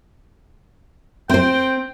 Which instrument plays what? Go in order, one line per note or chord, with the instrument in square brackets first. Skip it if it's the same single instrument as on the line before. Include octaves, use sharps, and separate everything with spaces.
[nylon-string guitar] C4 C5 [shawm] G5